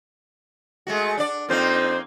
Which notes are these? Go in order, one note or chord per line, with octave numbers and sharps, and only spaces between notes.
G#3 A3 F#4
D4 D5
F2 A#3 C4 D#4 C5